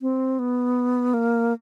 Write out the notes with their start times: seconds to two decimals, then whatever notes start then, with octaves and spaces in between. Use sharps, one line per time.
0.02 C4
0.39 B3
1.14 A#3